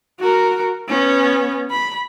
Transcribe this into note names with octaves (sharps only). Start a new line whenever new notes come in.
F#4 A#4
B3 C#4
B5